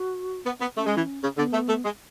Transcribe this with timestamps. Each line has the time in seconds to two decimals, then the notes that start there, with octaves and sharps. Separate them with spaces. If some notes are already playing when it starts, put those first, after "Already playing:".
Already playing: F#4
0.46 B3
0.61 B3
0.77 A3 C#4
0.86 G#3
0.97 E3
1.23 C#3
1.38 D3 B3
1.53 A3
1.68 A3
1.84 G#3